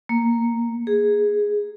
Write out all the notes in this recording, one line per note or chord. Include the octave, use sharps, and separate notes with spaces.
A#3
G#4